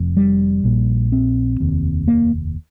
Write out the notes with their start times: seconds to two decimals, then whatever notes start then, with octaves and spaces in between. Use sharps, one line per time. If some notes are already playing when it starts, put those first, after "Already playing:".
Already playing: F1 F2
0.17 G3
0.64 A#1 A#2
1.12 C4
1.60 F1 D#2
2.08 A#3